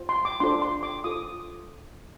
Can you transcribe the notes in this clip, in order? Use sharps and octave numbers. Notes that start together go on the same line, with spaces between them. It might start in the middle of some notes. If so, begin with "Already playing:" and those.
Already playing: F4 C5
C6
D6
D4 F4 A4 C5 C6
C6
D6
F4 A4 C5 D#6